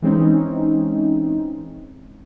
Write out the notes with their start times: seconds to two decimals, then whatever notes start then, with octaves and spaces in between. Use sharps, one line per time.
0.02 E3 G#3 C4 C#4 D#4